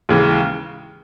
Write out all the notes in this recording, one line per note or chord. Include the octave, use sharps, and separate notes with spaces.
D#2 C#3 E3 G#3